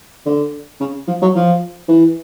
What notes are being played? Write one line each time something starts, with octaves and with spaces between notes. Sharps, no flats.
D3
C#3
F3
F#3
F3
E3